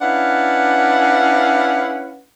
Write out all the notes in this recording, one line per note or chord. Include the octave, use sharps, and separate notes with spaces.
C#4 D4 E4 B4 F5 F#5